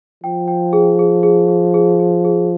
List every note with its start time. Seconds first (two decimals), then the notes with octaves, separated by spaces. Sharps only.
0.24 F3 G5
0.48 G5
0.73 G#4
0.99 G#4
1.23 G#4
1.48 G#4
1.74 G#4
2.00 G#4
2.25 G#4